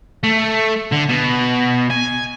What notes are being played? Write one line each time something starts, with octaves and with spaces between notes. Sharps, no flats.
A3
D3
B2
G#5